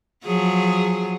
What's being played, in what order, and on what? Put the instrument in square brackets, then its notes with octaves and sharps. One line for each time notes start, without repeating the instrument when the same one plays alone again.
[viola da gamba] F3 F#3 G#4